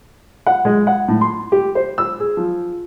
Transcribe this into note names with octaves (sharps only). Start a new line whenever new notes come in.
F#5
G#3
F#5
A2
C6
G4
C5
E6
G#4
F3